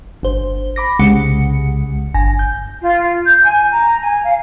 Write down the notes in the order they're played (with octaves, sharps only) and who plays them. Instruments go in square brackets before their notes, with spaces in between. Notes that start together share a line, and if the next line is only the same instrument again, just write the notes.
[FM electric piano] G1 C5
B5 D6 A#6
C2 C#3 G#3 F#5 C#7
G1 G#5 A#6
G6
[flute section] F4
G6
G#5
A#5
G#5
F5